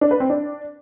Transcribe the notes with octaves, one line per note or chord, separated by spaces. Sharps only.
D4
B4
C4
D4